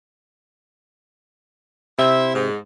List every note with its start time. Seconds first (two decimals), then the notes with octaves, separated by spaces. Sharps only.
1.99 C3 E4 C5 E5
2.33 G#2